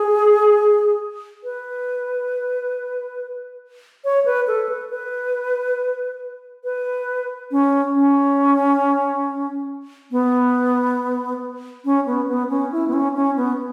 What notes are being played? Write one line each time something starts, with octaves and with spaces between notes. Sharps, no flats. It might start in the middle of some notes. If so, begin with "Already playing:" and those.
Already playing: G#4
B4
C#5
B4
A4
B4
B4
B4
C#4
C#4
B3
C#4
B3
B3
C#4
E4
B3
C#4
C#4
B3